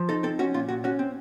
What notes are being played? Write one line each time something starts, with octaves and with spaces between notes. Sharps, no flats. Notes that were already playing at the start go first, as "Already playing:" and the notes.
Already playing: F3
D#4 A4
C4 A4
C#4 F#4
A#2 F4
A#2 F#4
C#4 F#4
C4